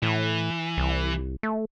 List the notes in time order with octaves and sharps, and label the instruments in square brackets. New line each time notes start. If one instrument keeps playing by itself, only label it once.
[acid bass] A2 [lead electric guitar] E3
[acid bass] C2
A3